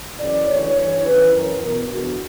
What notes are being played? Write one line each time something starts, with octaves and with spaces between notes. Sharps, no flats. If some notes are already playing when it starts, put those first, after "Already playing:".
F#2 C#3 E3 D5
D2 C#3 E3 C#5
G2 E3 C#5
E2 C#3 E3 B4
F#2 E3 A#4
E2 B2 A#4
E2 D3 F#4